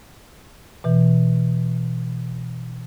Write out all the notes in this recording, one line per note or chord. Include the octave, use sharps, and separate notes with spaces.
B2 E3